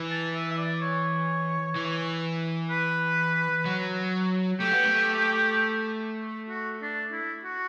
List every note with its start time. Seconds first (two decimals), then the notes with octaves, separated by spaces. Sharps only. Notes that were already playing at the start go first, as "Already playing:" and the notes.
Already playing: E3
0.11 A5
0.34 E5
0.51 E5
0.58 D5
0.82 C#5
1.76 E3
2.70 B4
3.66 F#3
4.60 A3 G4
4.72 B3
4.85 A3
6.50 F#4
6.82 D4
7.13 E4
7.45 F#4